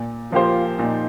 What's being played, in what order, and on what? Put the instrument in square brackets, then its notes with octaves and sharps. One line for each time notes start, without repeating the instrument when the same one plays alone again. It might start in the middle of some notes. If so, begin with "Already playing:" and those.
Already playing: [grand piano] A#2
[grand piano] F3 A#3 G4 C5 [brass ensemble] F4
[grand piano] A#2 [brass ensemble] D#4